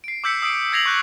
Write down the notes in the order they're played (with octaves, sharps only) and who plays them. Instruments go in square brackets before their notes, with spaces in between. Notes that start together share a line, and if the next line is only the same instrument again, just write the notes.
[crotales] C7 D7
D6 E6 G6 B6 C#7
D#6 E6 C7 D7
E6 G#6 A#6 C7 F7 F#7
C#6 F#6 G6